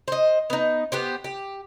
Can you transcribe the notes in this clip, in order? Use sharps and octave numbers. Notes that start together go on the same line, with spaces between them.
C5 D#5
B3 D#4
B3 G4 C5
G4